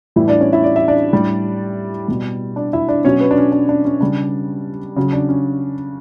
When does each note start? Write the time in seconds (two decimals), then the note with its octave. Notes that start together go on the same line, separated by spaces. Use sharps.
0.16 A2 E3 G3 E4 E5
0.28 D4 D5
0.41 C#4 C#5
0.53 E4 E5
0.64 D5
0.76 E5
0.88 D4 D5
1.13 A2 G3
2.08 B2 G3
2.56 D4 D5
2.73 E4 E5
2.88 D4 D5
3.05 B2 F#3 C#4 C#5
3.20 B3 B4
3.31 D4
3.37 C#4
3.52 D4
3.69 D4
3.85 C#4
4.01 C#3 G3 D4
4.96 C#3 F#3 C#4
5.13 D4
5.29 C#4